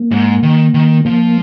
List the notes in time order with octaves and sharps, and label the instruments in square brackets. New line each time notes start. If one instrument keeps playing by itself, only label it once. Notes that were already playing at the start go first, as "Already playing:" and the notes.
Already playing: [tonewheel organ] A#3
[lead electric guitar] G#2
D#3
D#3
[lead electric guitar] F3 [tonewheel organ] A#3